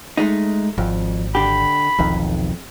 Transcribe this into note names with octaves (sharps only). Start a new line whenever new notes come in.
G#3 A3 D#4
G#1 F2
D3 G4 B5
E1 B1 F2 D#3